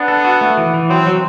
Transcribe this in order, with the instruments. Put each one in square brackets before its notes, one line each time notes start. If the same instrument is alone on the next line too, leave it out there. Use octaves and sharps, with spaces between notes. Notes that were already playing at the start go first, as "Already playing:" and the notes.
Already playing: [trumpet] B3 [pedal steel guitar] D4
[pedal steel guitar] A4
F#4
A3
E3
E3
[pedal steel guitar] F#3 [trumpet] C4
[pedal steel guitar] F#3